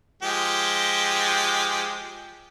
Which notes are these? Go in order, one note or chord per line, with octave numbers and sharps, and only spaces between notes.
F3 G#3 G4